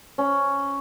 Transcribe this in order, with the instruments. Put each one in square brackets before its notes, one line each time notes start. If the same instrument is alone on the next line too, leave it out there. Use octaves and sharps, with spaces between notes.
[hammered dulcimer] C#4